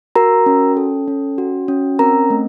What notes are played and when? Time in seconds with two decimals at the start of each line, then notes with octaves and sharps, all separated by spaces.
0.15 F#4 A#4 A#5
0.46 C#4
0.77 A4
1.08 C#4
1.38 F#4
1.68 C#4
1.99 C4 A#4 A#5
2.30 A3